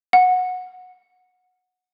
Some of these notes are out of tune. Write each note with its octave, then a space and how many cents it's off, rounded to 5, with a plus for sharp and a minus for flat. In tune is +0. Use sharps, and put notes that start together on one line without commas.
F#5 -15